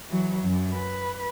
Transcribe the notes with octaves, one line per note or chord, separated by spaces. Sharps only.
E3 F#3
F#2
B4